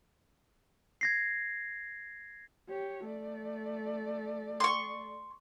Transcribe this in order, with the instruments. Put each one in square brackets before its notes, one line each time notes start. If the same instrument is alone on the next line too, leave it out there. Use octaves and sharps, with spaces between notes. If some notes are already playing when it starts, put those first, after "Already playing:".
[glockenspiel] G#6 A#6 C7
[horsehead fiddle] G4 C#5
A3 D5
[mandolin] C6 C#6